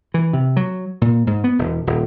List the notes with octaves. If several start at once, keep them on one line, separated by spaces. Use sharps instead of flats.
E3
C3
F#3
A#2
G#2
B3
E1
D#1